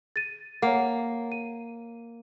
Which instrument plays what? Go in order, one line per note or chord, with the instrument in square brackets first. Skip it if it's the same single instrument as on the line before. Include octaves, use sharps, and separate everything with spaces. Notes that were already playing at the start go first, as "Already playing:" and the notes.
[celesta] A6 D#7
[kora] A#3 [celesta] C#5 F#5
[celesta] D#7